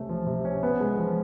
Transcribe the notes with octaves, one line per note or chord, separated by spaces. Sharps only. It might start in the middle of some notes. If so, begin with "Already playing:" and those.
Already playing: C3 A3 C#4
F3
C3
C#4
B3
G#3
F3